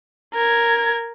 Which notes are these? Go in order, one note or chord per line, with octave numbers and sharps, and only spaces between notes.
A#4 G#6